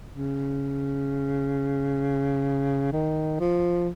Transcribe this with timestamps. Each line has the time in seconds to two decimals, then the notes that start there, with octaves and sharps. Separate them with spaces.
0.13 C#3
2.93 D#3
3.40 F3